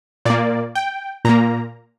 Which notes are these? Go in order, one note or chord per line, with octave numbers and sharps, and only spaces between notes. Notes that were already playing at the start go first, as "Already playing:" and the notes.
A#2 A#3 D5
G5
A#2 A#3 A#5